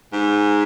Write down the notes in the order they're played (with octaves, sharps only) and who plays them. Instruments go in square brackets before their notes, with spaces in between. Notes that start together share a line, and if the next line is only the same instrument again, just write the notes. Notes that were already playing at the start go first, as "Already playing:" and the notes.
[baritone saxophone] G#2